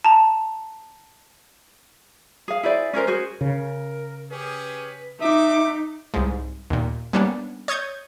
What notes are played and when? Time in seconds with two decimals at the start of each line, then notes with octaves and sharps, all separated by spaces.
0.05 A5 A#5
2.48 G#4 F5
2.63 E4 G#4 C5 D5
2.93 C#4 G#4 A#4 C5
3.07 F#4 G#4 C5
3.41 C#3 A#4
4.31 C#4 G4 G#4 B4
5.21 D#4 F#4 E5 D6
6.14 C2 G#2
6.70 D#2 A#2
7.13 G3 A#3 B3 C#4 D4
7.68 C#5 D#6 G6 G#6